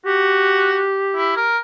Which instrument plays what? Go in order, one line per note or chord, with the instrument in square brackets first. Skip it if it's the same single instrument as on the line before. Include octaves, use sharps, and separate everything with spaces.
[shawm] F#4 [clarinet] G4
[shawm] E4
A#4